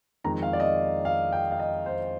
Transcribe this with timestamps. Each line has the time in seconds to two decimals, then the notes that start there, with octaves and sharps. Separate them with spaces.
0.24 F2 D#3 G#3 A#5
0.43 F5
0.53 D5
0.60 D#5
1.05 F5
1.33 G5
1.52 F5
1.59 D#5
1.86 C5